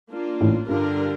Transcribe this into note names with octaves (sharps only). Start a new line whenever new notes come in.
A#3 D4 F4
A1 A2
G2 D3 G3 D4 F4 A#4